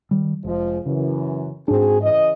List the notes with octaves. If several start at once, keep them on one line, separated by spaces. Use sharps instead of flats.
D#3 G3
F1 F3 G#3
F#2 C#3 E3
G#2 C4 D4 F#4 G#4
C#3 E3 D#5